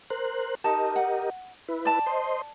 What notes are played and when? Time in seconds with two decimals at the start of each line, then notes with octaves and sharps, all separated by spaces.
0.10 A#4 C5 F#6
0.64 D#4 G4 A#4 D#5 A5
0.96 F#5
1.68 E4 B4
1.85 D5 A5
2.06 C5 D#5 C6